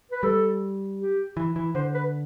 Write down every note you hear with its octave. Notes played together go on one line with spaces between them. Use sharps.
B4
G3 A4
G4
E3
E3
D3 C5
B4